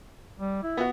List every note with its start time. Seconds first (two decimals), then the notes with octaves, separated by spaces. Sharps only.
0.40 G3
0.63 E4
0.77 B3 F#4